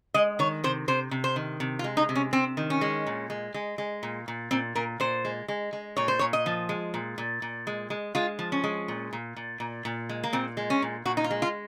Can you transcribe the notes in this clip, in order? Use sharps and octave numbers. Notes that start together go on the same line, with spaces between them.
G#3 D#5
D#3 C#5
C3 C5
C3 C5
C3
C5
D#3
C3
F4
G#3
D#4
C3
C#4
C3 C4
D#3
C#4
G#3
A#2
G#3
G#3
G#3
A#2
A#2
A#2 C4
A#2 A#4
A#2 C5
G#3
G#3
G#3
A#2 C#5
C5
A#2 C#5
D#5
F3
G#3
A#2
A#2
A#2
G#3
G#3
G#3 F4
F3
C#4
G#3
A#2
A#2
A#2
A#2
A#2
G#3
A#3
A#2 C4
G#3
C#4
A#2
A#2 F#4
D#4
F4
G#3
F4